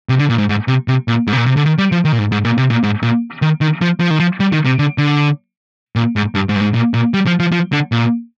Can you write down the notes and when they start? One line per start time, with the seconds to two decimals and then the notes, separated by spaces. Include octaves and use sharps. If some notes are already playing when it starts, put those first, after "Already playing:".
0.09 C3
0.19 D3
0.30 A#2
0.38 G#2
0.49 G#2
0.68 C3
0.88 C3
1.08 A#2
1.27 G#2
1.33 C3
1.37 A#2
1.46 C3
1.57 D3
1.66 D#3
1.78 G3
1.92 F3
2.05 D#3
2.12 A#2
2.19 G#2
2.32 G#2
2.45 A#2
2.58 C3
2.70 A#2
2.83 G#2
3.03 A#2
3.42 D#3
3.61 D#3
3.82 F3
4.00 F3
4.10 D#3
4.20 F3
4.40 G3
4.53 D#3
4.65 C3
4.79 D3
4.98 D3
5.96 A#2
6.16 G#2
6.35 G2
6.49 G#2
6.56 G2
6.61 G#2
6.74 A#2
6.94 A#2
7.14 G3
7.27 F3
7.40 F3
7.52 F3
7.73 D3
7.92 A#2